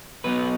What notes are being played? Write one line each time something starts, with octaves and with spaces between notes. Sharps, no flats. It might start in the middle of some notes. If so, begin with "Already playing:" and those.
B2 F#3 B3 D#4 B4